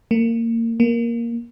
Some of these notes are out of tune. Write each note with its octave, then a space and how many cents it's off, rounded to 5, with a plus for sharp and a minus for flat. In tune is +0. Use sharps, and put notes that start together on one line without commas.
A#3 -25
A#3 +5